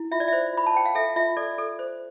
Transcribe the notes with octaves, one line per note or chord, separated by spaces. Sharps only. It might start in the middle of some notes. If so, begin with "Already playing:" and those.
Already playing: E4
F4 E5
D5
C5 E5
F4 B5
A5
C5 G5
F5
A4 E5
F4 E5
A4 D5
A4
C5